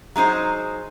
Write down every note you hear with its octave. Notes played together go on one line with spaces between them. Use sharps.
F#3 G#3 D#4 C5